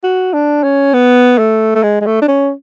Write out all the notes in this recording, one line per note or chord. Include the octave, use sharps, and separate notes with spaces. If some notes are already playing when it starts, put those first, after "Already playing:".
F#4
D4
C#4
B3
A3
A3
G#3
G#3
A3
D4
C#4